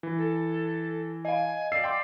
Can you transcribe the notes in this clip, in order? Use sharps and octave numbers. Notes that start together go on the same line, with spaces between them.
E3
A4
D#5 F5 G#5
D5 E6 C7
G5 C6 D6